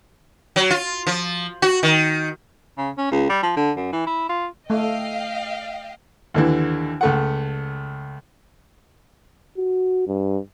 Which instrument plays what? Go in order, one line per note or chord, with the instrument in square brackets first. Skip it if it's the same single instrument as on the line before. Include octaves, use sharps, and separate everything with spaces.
[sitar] F#3
F4
F3
F#4
D#3
[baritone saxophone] C#3
C#4
C#2
G3
F3
D3
F#2
E3
E4
F4
[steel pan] A3 [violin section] D#5 F5 G5
[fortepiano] D#2 D3 E3
C#2 A3 F#5
[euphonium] F#4
G2